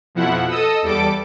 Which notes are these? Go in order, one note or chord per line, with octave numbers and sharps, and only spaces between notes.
F2 B2 F3 E4 F#5
A4 D#5 D#6 E6
E2 G3 A4 D6 D7